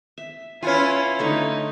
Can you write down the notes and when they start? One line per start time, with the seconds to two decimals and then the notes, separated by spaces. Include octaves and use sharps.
0.18 E5
0.63 C#4 E4 F4 B4 F#5 G#5
1.19 D3 A3 D#4 C#6